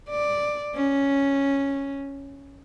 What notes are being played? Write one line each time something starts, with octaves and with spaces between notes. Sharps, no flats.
D5
C#4